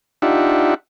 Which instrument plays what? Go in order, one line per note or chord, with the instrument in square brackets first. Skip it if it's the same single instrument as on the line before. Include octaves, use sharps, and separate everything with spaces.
[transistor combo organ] D4 D#4 F4 G4 E5 F#5